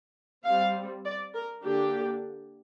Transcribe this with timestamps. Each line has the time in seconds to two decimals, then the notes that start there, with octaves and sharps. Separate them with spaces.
0.44 G3 C4 F5
1.04 D5
1.34 A#4
1.64 D3 A#3 D4 G4